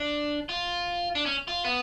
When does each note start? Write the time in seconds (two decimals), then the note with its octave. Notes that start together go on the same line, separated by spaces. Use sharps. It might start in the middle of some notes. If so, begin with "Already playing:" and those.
Already playing: D4
0.49 F4
1.15 D4
1.26 C#4
1.48 F4
1.64 B3